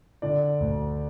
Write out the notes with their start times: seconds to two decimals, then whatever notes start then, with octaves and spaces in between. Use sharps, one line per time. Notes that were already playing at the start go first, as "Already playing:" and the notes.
0.22 D3 D5
0.60 D2